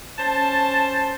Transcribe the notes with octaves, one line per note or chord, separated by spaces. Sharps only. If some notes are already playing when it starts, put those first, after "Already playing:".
C#4 C5 A5